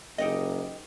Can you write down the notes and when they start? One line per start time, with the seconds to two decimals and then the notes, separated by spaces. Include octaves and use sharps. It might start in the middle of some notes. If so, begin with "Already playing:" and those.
0.18 F#1 D#4 G4 D#5